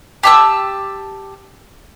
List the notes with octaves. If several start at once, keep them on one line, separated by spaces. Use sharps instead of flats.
G4 A5 E6